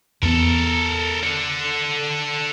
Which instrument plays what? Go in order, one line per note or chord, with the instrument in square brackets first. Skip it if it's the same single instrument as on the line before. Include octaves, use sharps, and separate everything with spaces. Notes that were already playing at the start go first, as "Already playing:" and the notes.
[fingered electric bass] E2 B3 [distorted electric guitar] A4 A#4
[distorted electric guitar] D4 A4